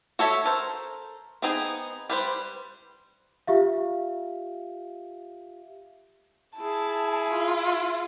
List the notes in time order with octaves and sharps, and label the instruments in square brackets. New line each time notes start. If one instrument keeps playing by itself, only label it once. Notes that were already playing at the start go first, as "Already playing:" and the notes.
[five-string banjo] F#4 A4 C#5 E5
A4 A#4 C5
B3 C4 D#4 G#4
G3 B4 C5
[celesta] F4 G4 E5 F5
[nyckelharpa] E4 G#4 [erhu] A5
[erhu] F4